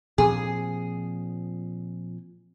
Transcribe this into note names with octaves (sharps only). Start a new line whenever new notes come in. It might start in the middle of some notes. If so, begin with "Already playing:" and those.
A#2 F3 C4 G#4